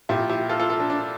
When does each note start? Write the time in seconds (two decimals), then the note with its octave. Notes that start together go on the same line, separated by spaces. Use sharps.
0.09 A#2 F3 E4 G4
0.29 E4 G4
0.49 F4 A4
0.60 F4 A4
0.70 F4 A4
0.80 D4
0.90 D4